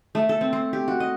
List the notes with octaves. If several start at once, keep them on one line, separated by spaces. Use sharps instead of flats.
A3
A4
C4
C4
G4
F#4
D#5